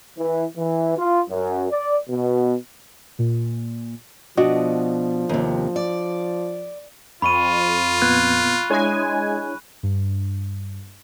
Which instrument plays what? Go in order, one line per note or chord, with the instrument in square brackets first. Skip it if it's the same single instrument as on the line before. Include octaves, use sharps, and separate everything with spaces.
[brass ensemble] E3
E3
F4
F#2
D5
B2
[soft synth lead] A#2
[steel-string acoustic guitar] B2 [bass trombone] F3 [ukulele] D4 F#4 D#5
[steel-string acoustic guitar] D#2 C3
D5
[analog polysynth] F2 [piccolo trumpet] F4 [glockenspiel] B5 C#6 D#7
[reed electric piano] A#2 B3 G#6 [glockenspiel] F#6
[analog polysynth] G#3 G#5 [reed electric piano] D4 E4 C#5
[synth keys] G2